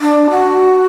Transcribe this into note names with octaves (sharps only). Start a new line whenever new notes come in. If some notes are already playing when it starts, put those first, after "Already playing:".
D4
F#4